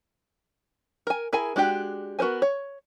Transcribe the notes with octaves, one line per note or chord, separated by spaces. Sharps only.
A#4 G#5
E4 G#4 A#4 G#5
G#3 D4 F#4 G4 G5
B3 F#4 A#4 C5 G#5
C#5